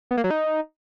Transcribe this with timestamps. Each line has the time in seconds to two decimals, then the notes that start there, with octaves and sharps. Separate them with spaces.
0.11 B3
0.17 A#3
0.24 F#3
0.31 D#4